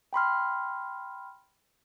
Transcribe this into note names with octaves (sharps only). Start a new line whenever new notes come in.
G5 B5 C6 F6